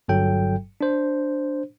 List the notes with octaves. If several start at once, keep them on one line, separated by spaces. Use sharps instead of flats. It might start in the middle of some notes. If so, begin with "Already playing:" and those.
G1 G2 F#3 A4 G5
D4 C5